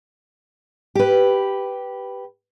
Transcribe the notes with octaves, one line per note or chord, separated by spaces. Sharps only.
G4 B4